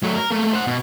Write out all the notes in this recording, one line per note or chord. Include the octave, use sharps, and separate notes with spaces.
F#3 A3
A#4
A3 A#3
C5 F#5
B2